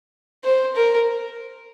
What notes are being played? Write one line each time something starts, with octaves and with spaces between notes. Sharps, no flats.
C5
A#4